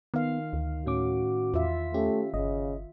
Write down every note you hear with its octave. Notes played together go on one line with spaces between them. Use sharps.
D#3 B3 F5
D2
A2 C#4 F#4 D6
E2 F4 E5
A3 C#4 G4
G1 C#3 D#5